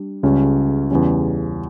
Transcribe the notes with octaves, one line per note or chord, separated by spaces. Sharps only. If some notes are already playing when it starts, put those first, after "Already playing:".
Already playing: G3 D4
C#2 C#3 G3 C#4
E2 C#3 G3 C#4